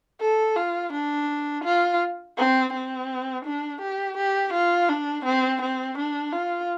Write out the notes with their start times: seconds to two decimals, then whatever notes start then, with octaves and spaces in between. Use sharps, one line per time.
0.21 A4
0.56 F4
0.93 D4
1.64 F4
2.38 C4
2.73 C4
3.45 D4
3.81 G4
4.17 G4
4.53 F4
4.89 D4
5.26 C4
5.61 C4
5.98 D4
6.33 F4